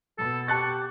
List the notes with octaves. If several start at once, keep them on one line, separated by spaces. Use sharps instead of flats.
B2 A4
G4 A5 C#6 F#6 A6